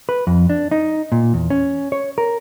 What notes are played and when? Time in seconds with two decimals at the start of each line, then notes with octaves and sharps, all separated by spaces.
0.09 B4
0.27 F2
0.50 D4
0.71 D#4
1.12 A#2
1.34 E2
1.50 C#4
1.92 C#5
2.18 A#4